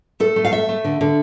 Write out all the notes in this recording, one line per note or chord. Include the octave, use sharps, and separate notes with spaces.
A3 A4
A3
F5
A3 E5
A3
D3
D3